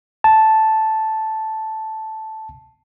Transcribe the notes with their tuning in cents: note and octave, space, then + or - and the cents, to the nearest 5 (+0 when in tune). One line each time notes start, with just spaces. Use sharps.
A5 -5